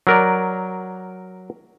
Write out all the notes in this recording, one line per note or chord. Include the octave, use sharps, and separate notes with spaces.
F#3 A#4 D5